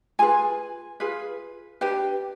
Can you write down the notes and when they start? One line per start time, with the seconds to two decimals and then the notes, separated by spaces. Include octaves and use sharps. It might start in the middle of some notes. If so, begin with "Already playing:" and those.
0.19 F4 G#4 B4 G#5
1.00 F4 G#4 B4
1.81 D4 G4 B4 G5